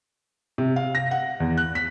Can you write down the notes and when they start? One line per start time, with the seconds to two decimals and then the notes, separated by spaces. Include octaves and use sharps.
0.58 C3
0.76 F5
0.95 A#6
1.11 F#5
1.40 E2
1.57 F#6
1.75 B6